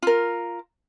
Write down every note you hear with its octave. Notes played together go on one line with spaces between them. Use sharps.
F4 A#4